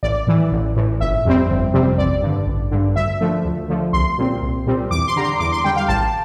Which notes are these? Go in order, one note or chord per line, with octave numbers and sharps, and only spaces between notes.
A1 D5
A2 E3
A1
A2 E3
G1 E5
F2 C3 G3 C4
G1
F2 C3 G3 C4
A1 D5
G2 D3
A1
G2 D3
D2 E5
D3 F3 A3
D2
D3 F3 A3
C2 C6
A#2 G3 C4
C2
A#2 G3 C4
E2 D6
C6
D3 G3 A#5
C6
E2 D6
C6
D3 G3 G5
F5
A1 A5